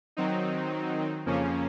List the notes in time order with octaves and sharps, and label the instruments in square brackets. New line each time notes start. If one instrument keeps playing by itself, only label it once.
[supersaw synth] D#3 F#3 C4 D#4
F2 C#3 F3 A#3 C#4